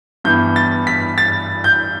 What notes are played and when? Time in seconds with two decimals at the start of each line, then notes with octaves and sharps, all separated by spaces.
0.24 G2 E3 B3 G6
0.56 A6
0.87 B6
1.18 A6
1.64 G6